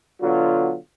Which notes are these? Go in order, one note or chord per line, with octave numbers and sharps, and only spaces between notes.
B2 D3 F#3 F4